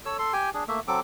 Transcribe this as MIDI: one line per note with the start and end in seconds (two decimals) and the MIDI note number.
0.05 0.17 69
0.05 0.17 73
0.05 0.17 88
0.19 0.33 69
0.19 0.33 84
0.33 0.50 67
0.33 0.50 79
0.33 0.50 80
0.54 0.64 62
0.54 0.64 68
0.68 0.80 57
0.68 0.80 58
0.68 0.80 76
0.88 1.00 54
0.88 1.00 60
0.88 1.00 69
0.88 1.00 86